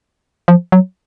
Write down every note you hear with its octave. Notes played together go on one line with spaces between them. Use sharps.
F3
F#3